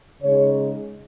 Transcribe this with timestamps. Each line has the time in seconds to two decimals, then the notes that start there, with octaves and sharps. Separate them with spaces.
0.23 C#3 G#3 D#4 C#5